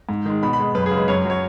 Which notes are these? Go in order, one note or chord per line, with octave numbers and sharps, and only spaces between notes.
G#2
D#3 G#3
B2 B5
B5
G#3
F#2 B4
G#4
C#3
G#3 B4
F#2 C#5
F#3 C#5